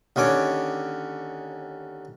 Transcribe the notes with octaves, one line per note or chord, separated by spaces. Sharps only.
D#2 D3 C#4 C#5 D6